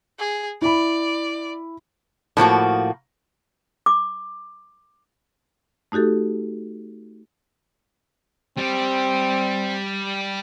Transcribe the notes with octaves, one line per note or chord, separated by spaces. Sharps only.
G#4
E4 D5 B5
A2 F3 A#3 F#4
D6
A3 D#4 F#4 G4 A4
G3 C4 G4